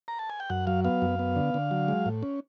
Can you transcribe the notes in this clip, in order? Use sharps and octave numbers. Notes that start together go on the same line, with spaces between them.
A#5
A5
G#5
G5
F#2 F#5
F#3 F5
B3 F5
F#2
B3
D3
D3
F#3
G#3
A2
C#4